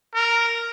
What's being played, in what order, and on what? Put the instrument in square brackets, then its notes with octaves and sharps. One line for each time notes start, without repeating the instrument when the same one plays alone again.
[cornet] A#4